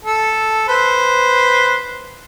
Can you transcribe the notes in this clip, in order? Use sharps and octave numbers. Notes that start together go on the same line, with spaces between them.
A4
B4 C5